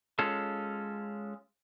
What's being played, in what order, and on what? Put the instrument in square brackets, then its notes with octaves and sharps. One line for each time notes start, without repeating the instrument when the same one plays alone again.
[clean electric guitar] G#3 C#4 F4 A4